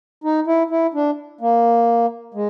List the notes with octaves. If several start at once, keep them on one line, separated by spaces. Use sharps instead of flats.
D#4
E4
E4
D4
A#3
G#3